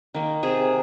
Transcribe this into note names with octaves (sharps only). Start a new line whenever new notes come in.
D#3 A#3
C3 G#4